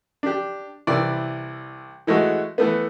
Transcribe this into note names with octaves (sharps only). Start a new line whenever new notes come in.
D4 G4
C2 E3 E4 D5
E3 G#3 A3 F#4
E3 A3 B3